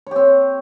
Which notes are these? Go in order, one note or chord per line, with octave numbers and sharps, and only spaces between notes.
C4 G4 C#5